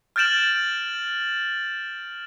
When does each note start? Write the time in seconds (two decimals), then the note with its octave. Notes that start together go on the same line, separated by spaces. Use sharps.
0.16 F6 G6 A6 D7 E7 F#7